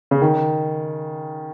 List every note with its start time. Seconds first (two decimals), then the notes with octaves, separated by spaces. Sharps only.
0.11 C#3
0.22 D#3